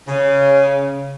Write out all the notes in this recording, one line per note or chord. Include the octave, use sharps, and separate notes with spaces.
C#3